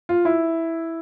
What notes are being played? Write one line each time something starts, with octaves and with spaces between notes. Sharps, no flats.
F4
E4